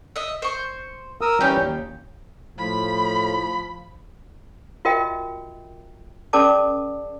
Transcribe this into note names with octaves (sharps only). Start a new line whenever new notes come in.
D#5 E5
C5 C#6
A#4 D#6 E6
E3 G3 C#4 D#4 G4
D#2
A2 F3 B5
F4 F#4 A#4 D#5 E5 G5
C#4 G#4 A#4 D5 A5 D6